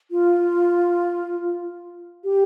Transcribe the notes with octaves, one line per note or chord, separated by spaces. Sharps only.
F4
G4